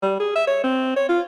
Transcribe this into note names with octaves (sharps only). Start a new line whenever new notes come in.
G3
G#4
E5
C#5
C4
C#5
F4